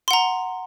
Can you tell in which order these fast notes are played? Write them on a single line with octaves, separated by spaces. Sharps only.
C6 F#5 A#5